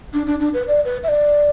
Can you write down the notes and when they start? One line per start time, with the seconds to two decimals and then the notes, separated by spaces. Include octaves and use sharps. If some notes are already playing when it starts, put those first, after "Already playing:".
0.13 D4
0.27 D4
0.40 D4
0.54 B4
0.68 D5
0.85 B4
1.04 E5
1.08 D5